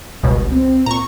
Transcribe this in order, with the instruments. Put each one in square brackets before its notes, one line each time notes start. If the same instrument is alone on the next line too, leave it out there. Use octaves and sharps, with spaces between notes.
[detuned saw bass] G1 [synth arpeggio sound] C#2 B2
[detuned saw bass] C4
[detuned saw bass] A#2 [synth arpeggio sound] A#5 C#6